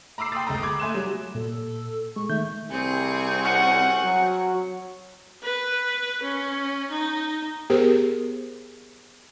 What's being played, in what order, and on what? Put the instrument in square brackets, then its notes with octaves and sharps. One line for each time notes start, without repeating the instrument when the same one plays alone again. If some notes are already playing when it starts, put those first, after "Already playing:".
[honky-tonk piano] A#5 B5 D6 E6 C7
G5 B5 C6 D#6 E6 A6
G1 D2 G#3 G5 A#5
B5 D6 G#6
A3 E5 G#5 C6 F#6 E7
F#3 G3
[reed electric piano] A#2 [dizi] A4
[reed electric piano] G#3 [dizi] C#6
[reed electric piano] D#3 A3 G6 [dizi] E5
[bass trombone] C2 [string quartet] C4 G#4 C#6
[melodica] C#4 F#4 [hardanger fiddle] F#5
[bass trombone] F#3
[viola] B4
C#4
D#4
[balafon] B3 G4 G#4 A#4 C5